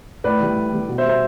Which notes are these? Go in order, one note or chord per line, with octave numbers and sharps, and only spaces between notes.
A2 B4 D5
E3 G3
A2
E3 G3
B2
C5 E5
G3
C5 E5